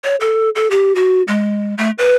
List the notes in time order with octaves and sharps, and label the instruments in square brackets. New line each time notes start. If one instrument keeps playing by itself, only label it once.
[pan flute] C#5
A4
A4
G4
F#4
G#3
A3
B4